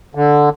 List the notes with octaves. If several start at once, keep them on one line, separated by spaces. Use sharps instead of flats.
D3